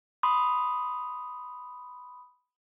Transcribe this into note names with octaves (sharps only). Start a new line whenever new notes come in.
B5 C6 D#6